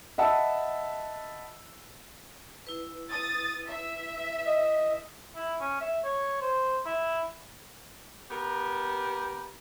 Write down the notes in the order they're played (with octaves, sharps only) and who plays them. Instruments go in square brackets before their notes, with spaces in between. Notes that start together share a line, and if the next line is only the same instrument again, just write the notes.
[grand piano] D#5 E5 F#5 A5 B5 E6
[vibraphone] E4 B4
[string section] D#6 A6
E5
[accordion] D#5
[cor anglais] E4
C#4
E5
C#5
C5
E4
[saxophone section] B3 G4 A#4